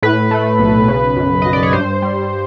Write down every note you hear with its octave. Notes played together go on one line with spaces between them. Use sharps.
A2 B4
A3
B1
C#3
F#2
F#2 D#5
D5
C#5
G2 C5
G3